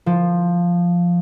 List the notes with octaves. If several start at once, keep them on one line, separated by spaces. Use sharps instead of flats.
F3